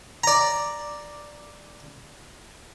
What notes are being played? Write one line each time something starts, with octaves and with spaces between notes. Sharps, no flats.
D5 A#5